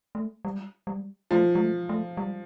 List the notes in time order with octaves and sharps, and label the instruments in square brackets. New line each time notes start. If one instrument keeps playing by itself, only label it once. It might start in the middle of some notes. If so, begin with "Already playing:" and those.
[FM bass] A3
G3
G3
[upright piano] F3 [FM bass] A3
[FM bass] G3
A3
A3
G3